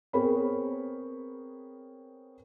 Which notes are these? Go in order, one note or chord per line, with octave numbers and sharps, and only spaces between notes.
B3 C4 G#4 A#4 C#5 B5